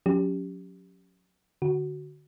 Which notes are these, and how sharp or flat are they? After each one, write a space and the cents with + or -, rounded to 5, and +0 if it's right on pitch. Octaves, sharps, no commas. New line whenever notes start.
F#3 -25 C#4 +15 G4 +0
D3 +0 F#4 +0